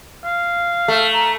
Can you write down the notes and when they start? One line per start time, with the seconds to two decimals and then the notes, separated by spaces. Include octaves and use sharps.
0.25 F5
0.88 A3
1.14 A#5